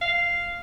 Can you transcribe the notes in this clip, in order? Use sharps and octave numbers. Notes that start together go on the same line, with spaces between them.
F5